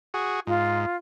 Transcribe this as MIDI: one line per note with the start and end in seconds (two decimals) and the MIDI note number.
0.14 0.40 66
0.14 0.40 68
0.47 0.86 44
0.47 0.97 65